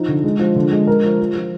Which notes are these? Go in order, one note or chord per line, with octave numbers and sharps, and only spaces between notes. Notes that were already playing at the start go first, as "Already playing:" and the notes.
Already playing: F3 D#4
D3
G#3
F3
D3
G#3
A#4
F3
F3
F3